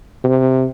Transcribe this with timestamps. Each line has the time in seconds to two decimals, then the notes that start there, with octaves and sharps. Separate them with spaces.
0.24 C3